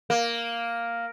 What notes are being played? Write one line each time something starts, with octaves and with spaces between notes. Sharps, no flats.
A#3